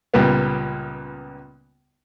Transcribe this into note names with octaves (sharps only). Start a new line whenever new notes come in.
C#2 A#2 G3 B3